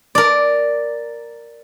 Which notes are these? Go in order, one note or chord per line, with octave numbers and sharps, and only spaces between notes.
A#4 D5